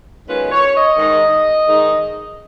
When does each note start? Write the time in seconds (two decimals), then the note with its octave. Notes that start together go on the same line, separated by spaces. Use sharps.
0.28 F#2 D#3 G#3 C#4 F4 B4
0.52 C#5
0.75 D#5
0.98 G#2 D#3 G#3 D#4
1.67 G#2 D#3 G#3 D#4